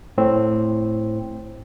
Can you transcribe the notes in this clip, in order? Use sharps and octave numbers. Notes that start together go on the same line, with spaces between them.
A2 C4